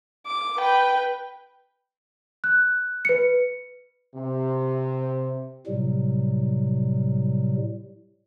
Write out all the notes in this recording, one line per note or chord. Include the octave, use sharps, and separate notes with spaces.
D6
B4 G5
F#6
B4 C#7
C3
A2 C3 F#3 G3